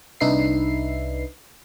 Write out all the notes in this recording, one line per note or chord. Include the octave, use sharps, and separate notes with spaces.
C2 D4 D#4 B4 E5 C7